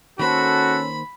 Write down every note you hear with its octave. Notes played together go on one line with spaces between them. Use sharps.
D#3 A#3 C#4 F#4 A4 C5 B5